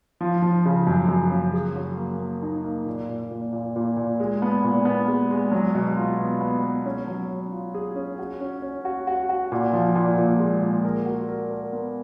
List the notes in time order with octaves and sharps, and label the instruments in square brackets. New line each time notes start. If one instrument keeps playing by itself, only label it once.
[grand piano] F3
F3
C#3
F#2
F#2
C#3
G#4
F#3
A#3
A#3
D#4
A#3
A#2
A#2
A#2
A#2
A#2
A#2
G#3
B3
A#2
B3
G#3
G#3
F#3
B2
F4
B3
B3
B3
C#4
F#3
C#4
F4
G#4
C#4
F#4
C#4
C#4
F#4
F#4
F#4
A#2
F3
A#2
A#2
G#3
A#2
A#4
F#4
A#4
A#4
B3